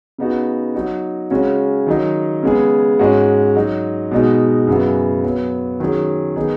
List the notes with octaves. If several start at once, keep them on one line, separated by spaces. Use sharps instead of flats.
C#3 B3 D#4 F#4
F#3 D#4 F#4
C#3 G#3 C#4 F#4
D#3 F#3 D#4
C#3 G#3 B3 G#4
G#2 G#3 C#4 F#4
F#3 D#4 F#4
B2 G#3 D#4 F#4
F#2 C#3 B3 F#4
F#3 B3 F#4
D#3 F#3 C#4 G#4
D#3 B3 D#4 G#4